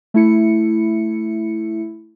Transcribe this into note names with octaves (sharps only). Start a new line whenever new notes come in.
A3 E4 C#7